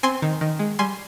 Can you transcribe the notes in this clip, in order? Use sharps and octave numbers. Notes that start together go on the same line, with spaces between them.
C4 G#5 C6
D#3
D#3
G#3
G3 G#5 C6